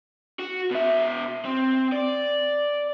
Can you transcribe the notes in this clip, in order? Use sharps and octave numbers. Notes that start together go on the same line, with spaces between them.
F#4
B2 E5
C4
D5